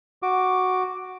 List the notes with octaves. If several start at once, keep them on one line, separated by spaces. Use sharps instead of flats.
F#4 D6